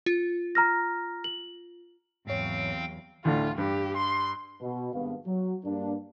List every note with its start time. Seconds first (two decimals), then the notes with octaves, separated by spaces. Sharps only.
0.06 F4
0.55 A#5 F6 A#6
1.24 F#7
2.27 E2 G#2 F#3 C4 C#5 F5 G5
3.25 D2 A2 D3 F4
3.58 G2 G4
3.96 C6
4.61 B2
4.93 G#1 G2 B3 F5
5.26 F#3
5.64 G2 A#3 D4